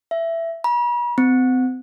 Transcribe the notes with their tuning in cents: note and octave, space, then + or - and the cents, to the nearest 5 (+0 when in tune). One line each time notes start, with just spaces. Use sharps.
E5 +10
B5 -45
C4 -35